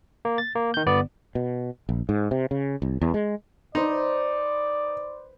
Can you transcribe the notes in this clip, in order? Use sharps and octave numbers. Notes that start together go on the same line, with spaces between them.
A#3
A6
A#3
D#3 G6
G1 B3 D5
B2
A#1
G#2
C3
C#3
C2
E2
G#3
D#4 B4 C5 D5